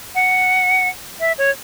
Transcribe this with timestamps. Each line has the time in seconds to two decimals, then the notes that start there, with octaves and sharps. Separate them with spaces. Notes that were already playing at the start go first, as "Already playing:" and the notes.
0.15 F#5
1.20 E5
1.38 C#5